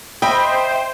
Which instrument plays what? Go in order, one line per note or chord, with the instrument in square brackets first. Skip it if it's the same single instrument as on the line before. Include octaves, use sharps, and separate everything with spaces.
[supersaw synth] C5 [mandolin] D#5 B5 [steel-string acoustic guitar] E5 [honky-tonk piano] G5